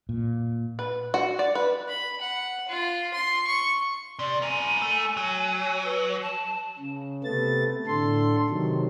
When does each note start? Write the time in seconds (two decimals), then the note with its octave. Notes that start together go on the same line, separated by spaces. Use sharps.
0.09 A#2
0.79 B4
1.14 F#4
1.39 D5
1.55 B4
1.89 B5
2.21 F#5
2.69 F4
3.14 C6
3.47 C#6
4.19 C3 D5
4.42 E4 A#4 G#5
4.82 A3
5.17 F#3
5.85 B4
6.22 A5
6.79 C#3
7.24 C3 A3 B3 A6
7.87 A2 D3 A4 C6
8.49 C3 D#3 F#3